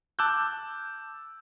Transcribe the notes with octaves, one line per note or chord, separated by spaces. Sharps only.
A5 D6 E6 F#6 G6